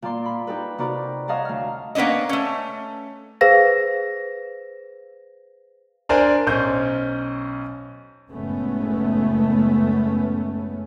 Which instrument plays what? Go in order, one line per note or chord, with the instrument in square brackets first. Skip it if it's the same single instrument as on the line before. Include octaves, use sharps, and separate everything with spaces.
[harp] A#2 A#3 D5 C6
B5
D#4 G4 A4 B4
C3 D#4 F#4 A#4 D5 B5
C#5 D#5 F5 F#5 A5 A#5
D2 F6
[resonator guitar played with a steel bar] A#3 B3 C#4 D4 D#5
A3 C#4
[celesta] G#4 B4 C5 F5 A#6
[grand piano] D4 A#4 C5 D5 G#5
B1 C#4 C5 G6
[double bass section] F#1 A2 G#3 A3 B3 C#4